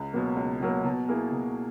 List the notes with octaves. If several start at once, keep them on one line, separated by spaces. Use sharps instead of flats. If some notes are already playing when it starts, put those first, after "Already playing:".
Already playing: C#2
B2 F#3 A#3
C#2
B2 F#3 A#3
B2
A#3 E4 G#4
B2